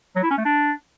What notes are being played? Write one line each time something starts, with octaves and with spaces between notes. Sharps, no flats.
F#3
E4
C#4
A3
D4